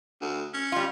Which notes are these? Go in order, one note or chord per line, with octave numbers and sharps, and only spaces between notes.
D2
C#4
G3 F4